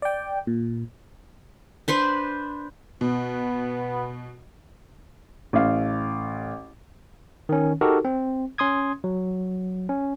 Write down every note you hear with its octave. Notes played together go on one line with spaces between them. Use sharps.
D5 G5
A#2
D4 B4 C5
B2 B3
A1 F5
D#3 C#4
D#4 F#4 G4 A4 A#4
C4
C#4 C6 D#6 G#6
F#3
C#4